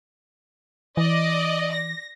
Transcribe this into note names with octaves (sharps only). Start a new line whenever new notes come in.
E3 D5 D#5
A#6